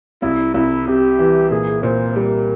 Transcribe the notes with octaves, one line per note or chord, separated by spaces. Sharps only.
C2 E4
C2 E4
C3 G4
E3
A#2 G#4
A#2 C5
G3 A#4